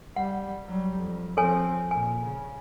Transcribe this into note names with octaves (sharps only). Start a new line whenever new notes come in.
G3 F#5
F#3 G3
F2
F3 C4 A4 C#5 G#5
A#2 G#5
C#3